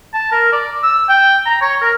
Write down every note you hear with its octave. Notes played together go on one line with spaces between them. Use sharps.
A5
A#4
D5
E6
G5
A#5
C#5
A#4